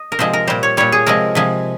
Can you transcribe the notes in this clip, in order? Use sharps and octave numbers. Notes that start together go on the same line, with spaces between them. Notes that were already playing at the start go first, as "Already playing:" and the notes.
Already playing: D#5
A#4
C3 F3 G#3 C5
A#4
A#2 G3 C5
C#5
A#2 G3 C#5
G#4
C3 F3 G#3 A#4
C3 F3 G#3